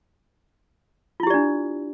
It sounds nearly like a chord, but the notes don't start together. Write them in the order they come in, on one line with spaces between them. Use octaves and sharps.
F4 E4 G4 D5 D4